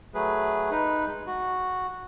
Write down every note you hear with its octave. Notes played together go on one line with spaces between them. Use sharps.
F#3 A3 G#4 B4
D#4 B4
G#3
F#4